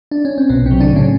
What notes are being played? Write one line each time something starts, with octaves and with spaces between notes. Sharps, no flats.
D4
C#4
C4
B1 B2 B3
C3 F#3 C4
D3 D4
A2 C#3 C#4